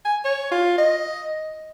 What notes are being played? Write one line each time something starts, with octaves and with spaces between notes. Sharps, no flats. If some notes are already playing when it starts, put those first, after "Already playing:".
G#5
C#5
F4
D#5